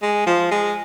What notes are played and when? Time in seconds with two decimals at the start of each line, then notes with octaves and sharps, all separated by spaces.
0.02 G#3
0.26 F3
0.51 G#3